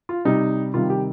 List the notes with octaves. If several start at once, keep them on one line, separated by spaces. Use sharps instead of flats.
F4
C3 G3 D#4
C3 D#3 G3 F4
G4